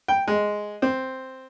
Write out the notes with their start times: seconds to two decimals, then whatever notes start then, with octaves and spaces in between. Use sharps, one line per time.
0.08 G5
0.28 G#3
0.82 C4